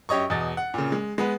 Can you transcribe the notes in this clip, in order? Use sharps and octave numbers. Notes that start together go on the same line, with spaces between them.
F#2 G4 C#5 D#5 C#6
E2 B2 D#5 A6
F#5
A#2 C#3
G#3
G#3 B3 B4